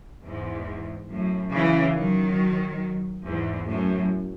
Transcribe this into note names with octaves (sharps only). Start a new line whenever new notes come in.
E2 G#2
F#2 A2
C#3 E3
D#3 F#3
E2 G#2
F#2 A2